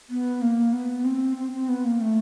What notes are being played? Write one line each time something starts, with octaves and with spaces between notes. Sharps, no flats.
B3
A#3
B3
C4
C4
C4
B3
A#3
A3